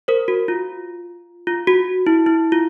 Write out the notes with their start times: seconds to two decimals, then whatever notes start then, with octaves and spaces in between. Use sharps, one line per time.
0.08 A#4 C5
0.28 F#4
0.48 F4
1.47 F4
1.67 F#4
2.07 E4
2.26 E4
2.52 F4